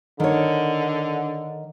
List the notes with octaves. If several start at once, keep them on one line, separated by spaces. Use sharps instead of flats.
D3 D#3 C#5